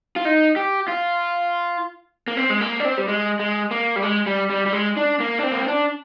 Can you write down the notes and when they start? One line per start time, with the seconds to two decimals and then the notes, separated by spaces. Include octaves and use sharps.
0.16 F4
0.25 D#4
0.56 G4
0.88 F4
2.28 A#3
2.37 C4
2.50 G#3
2.61 A#3
2.80 D4
2.85 C4
2.98 G3
3.08 G#3
3.40 G#3
3.71 A#3
3.96 G3
4.03 G#3
4.26 G3
4.50 G3
4.66 G3
4.73 G#3
4.97 D4
5.20 A#3
5.39 D4
5.43 C4
5.52 A#3
5.60 C4
5.68 D4